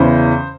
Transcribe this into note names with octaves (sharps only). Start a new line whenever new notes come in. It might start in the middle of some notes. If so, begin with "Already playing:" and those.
Already playing: E2 C#3 E3 C5